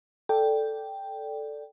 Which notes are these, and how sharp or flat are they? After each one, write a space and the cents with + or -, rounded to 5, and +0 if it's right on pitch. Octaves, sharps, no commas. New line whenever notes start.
A4 +0 D5 +0 G5 +0